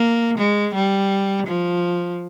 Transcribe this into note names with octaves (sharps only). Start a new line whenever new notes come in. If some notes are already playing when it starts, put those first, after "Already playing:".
Already playing: A#3
G#3
G3
F3